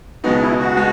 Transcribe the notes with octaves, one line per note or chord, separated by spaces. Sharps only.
C#2 B2 G#3 B3 D#4 F#4
E4
F#4
B2 G#3